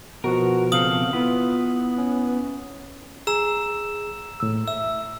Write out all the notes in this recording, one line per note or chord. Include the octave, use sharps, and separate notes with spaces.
B2 F3 B3 F#4 A#4
C#3 C4 A4 F5 D#6 F#7
B3 E4 F4 B4
C#4
G#4 A#5 E6 E7
A2 E6
E5 E6